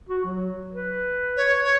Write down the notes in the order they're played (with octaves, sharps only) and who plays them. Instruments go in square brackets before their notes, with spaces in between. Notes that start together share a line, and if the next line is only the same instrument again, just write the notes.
[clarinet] F#4
F#3
B4
[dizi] C#5
C#5